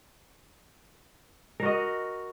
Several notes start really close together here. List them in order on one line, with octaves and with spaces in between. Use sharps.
A#4 F#4 D#5